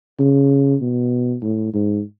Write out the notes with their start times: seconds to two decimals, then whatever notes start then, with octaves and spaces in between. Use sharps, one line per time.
0.20 C#3
0.81 B2
1.42 A2
1.74 G#2